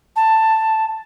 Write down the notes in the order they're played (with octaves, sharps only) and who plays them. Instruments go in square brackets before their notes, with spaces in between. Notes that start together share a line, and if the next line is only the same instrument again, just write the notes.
[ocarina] A5